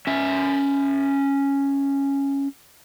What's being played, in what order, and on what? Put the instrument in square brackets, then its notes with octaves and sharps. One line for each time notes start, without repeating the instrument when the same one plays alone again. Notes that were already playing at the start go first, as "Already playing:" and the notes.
[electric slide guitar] C#4 E5